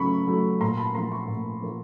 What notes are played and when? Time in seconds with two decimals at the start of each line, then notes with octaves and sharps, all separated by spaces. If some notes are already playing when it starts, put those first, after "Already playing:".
Already playing: C#3 F#3 A3 B5 C#6
0.27 F#3 A3
0.61 A#2 A#5 C6
0.77 A5 B5
0.95 F3 A#3 A#5 C6
1.12 B5 C#6
1.28 A#2
1.62 F3 A#3